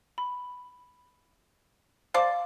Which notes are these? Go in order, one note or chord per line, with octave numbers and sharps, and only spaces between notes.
B5
C5 D5 F5 A5 D6